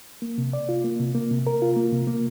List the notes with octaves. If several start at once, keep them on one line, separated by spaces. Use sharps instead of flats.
A#3
C3
D5
F4
A#3
C3
A#3
C3
A#4
F4
A#3
C3
A#3